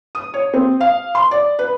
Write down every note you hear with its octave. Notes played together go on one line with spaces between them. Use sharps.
D#6
C#5
C4
F5
C6
D5
B4